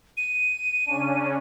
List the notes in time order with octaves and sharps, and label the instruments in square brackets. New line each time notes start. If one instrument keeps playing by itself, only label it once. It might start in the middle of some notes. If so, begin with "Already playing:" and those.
[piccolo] D#7
[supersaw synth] C#3 C#4 D4